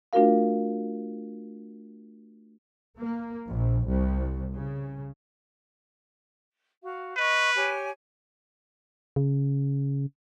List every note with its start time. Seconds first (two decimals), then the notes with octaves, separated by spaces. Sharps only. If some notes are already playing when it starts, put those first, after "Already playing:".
0.13 A3 D4 F4 F#4 A#4 F5
2.99 A#3
3.48 A#1
3.86 C2
4.54 C#3
6.83 F#4 F5
7.17 B4 D#5 C#6
7.54 G4 C#5 G#5
9.16 C#3